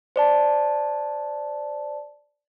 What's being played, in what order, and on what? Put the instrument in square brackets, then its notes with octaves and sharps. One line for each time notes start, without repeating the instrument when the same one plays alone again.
[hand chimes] C5 D5 A5